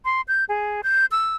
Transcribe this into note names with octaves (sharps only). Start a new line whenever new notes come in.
C6
G6
G#4
G6
E6